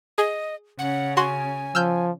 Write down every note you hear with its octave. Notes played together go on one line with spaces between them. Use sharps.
G#4 D#5
C#3 C#4 F#5
F#4 G#5 C6
F3 E6 F6 G6